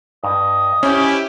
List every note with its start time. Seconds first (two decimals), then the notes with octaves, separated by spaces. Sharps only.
0.24 G2 D#5
0.83 C#4 E4 G4 C5